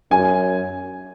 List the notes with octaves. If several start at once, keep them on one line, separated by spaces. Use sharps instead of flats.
F#2 G#5